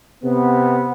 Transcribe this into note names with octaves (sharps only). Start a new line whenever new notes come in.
C3 B3